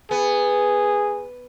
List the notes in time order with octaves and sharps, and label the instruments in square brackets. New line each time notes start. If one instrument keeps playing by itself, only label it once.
[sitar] B3 [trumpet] G#4